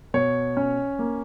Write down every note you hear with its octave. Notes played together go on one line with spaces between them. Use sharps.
B2 C#5
C#4
A#3